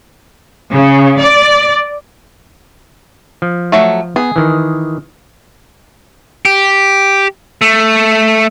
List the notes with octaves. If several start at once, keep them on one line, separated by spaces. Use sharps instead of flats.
C#3
D5
F3
F#3 A3
B3 G#4
D#3 E3
G4
A3